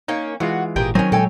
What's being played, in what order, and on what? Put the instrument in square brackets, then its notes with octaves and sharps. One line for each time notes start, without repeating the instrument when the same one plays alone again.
[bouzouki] A#3 C#4 [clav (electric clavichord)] D#4
[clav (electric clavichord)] E3 G#3 F4 [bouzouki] F#4
[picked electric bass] G#1 A#2 [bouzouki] G4 G#4 A#4
[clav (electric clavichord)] D#3 C4 [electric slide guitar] F#3 C#5 [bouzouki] C#4 G#5
[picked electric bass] A#2 G#3 [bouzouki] A4 G5 G#5